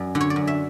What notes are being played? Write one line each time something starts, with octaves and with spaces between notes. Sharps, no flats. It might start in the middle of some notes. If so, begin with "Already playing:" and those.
Already playing: F#2 D5
D3
C#5
D5
F#2
E5